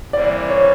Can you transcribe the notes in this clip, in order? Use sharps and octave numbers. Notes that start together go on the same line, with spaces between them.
C3 E3 G3 A#3 D5
C#5